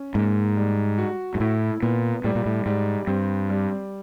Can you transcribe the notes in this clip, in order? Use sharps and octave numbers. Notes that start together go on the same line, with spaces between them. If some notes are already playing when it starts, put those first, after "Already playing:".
Already playing: C#4
G#2 A#3
G3
F#4
G#2
A2 E4
A#2 B3
A2 G3
A#2
A2
G#2 G3
G2 C4
G3